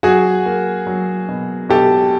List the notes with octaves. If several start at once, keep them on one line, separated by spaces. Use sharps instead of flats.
F#3 F#4 G#4
A#3
F#3
B2
B2 G4 A4